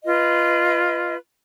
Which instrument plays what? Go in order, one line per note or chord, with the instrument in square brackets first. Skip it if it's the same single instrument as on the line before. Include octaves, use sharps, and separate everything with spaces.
[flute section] F4 B4 D#5